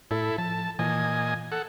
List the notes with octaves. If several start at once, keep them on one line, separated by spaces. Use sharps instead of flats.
A2 E4 A4
F3 A5
A#2 E3 D#5 G#5
A4 F#5